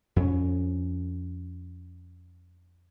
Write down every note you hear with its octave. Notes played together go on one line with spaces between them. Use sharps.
F2 C#4